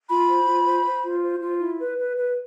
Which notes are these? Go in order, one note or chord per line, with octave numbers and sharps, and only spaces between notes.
F4 B5
C5
F4
C5
C5
F4
C5
F4
E4
B4
B4
B4